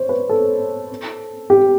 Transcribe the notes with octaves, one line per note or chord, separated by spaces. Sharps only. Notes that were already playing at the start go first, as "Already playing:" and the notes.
Already playing: C5 C#5
B4
A4
G4